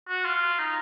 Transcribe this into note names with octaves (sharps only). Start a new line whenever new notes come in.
F#4
F4
D#4